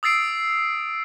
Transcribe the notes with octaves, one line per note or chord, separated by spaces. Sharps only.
D#6 E6 A6 C7 D7